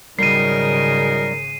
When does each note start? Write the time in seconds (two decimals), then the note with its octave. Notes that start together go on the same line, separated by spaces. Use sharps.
0.19 G#1 C#3 F#3 G3 D#4 A#4 C7 D#7